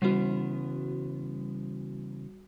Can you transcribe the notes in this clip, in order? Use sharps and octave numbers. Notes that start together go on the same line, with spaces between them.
C#3 E3 G3 B3 F#4